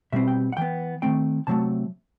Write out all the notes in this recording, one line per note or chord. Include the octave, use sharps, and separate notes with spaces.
B2 G3 C4 E5
G5
F#5
E3 B3 G5
D#3 A3 C4 G5
C3 F#3 A3 A5